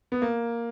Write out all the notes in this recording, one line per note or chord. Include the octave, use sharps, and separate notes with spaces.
B3
A#3